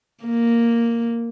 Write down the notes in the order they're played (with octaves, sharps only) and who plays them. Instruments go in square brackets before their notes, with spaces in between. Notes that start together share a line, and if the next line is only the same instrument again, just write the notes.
[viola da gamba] A#3